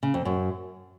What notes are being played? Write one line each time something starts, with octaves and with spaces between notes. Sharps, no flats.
C#3
F2
F#2